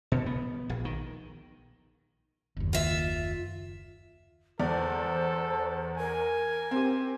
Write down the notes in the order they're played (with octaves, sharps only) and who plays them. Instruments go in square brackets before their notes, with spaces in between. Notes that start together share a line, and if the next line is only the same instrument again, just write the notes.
[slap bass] B2
B3
A#1
D#3
[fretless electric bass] F#1 D#2
[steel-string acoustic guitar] F4 E5
[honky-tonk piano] E2 D5 [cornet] A4 [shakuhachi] C5
[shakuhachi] A#4 [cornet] G#5
[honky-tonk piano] C4 G4